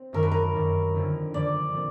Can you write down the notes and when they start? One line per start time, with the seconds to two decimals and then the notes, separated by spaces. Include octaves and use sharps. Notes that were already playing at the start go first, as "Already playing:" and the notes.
Already playing: C4
0.13 F#2 D#3 G3 A#4
0.23 B4
0.32 A#4
0.54 F#2 D#3 G3
0.94 F2 D3 F3 A#3
1.33 F2 D3 F3 A#3 D5
1.73 A#2 F3 A3 C4